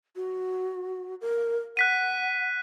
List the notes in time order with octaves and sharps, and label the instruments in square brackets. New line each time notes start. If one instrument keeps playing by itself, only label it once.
[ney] F#4
A#4
[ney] F#5 [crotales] F#6 B6 D#7